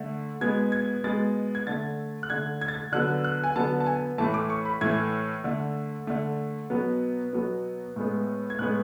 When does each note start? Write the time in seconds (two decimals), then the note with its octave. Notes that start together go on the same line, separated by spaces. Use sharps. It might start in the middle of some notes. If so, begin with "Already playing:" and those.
Already playing: D3 A3
0.41 B2 G#3 B3 G#6
0.72 G#6
1.04 B2 G#3 B3 A6
1.55 G#6
1.67 D3 A3 A6
2.23 F#6
2.30 D3 A3 G#6
2.61 G#6
2.68 A6
2.75 G#6
2.92 D3 F#3 B3 F#6
3.24 F#6
3.44 G#5
3.55 D3 F#3 B3 A5
3.80 A5
3.86 G#5
4.18 A2 E3 A3 A5
4.34 D6
4.50 C#6
4.65 B5
4.81 A2 E3 A3 G#6
5.44 D3 A3
6.07 D3 A3
6.70 B2 F#3 B3
7.33 B2 F#3 B3
7.96 A2 G#3 B3
8.50 G#6
8.59 A2 G#3 B3 F#6